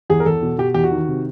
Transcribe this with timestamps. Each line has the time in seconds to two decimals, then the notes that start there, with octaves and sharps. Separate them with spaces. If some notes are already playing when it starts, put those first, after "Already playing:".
0.10 E2 G#4
0.20 A#4
0.26 E2 A4
0.42 B2
0.58 B2 G4
0.74 E2 G4
0.84 F#4
0.91 D#3
1.08 C3